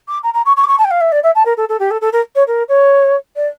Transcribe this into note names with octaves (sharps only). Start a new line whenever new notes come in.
D6
A#5
A#5
C#6
C#6
D6
C#6
A5
G5
F5
E5
D5
E5
A5
A#4
A4
A4
G4
A4
A4
A#4
C#5
A#4
C#5
D5